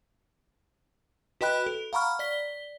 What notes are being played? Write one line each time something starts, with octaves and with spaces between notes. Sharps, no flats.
F#4 B4 D#5 G5 B5 F#6
A4
F5 F#5 A#5 B5 C#6 F6
D5 B6 G7